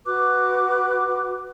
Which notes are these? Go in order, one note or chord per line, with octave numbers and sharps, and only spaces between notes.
F#4 B4 D6 F#6